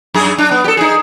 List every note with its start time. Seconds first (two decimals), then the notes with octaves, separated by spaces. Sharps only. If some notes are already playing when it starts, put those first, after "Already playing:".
0.14 F#2 G#4
0.38 D4
0.51 B3
0.64 G4 A4
0.77 D#4 G#4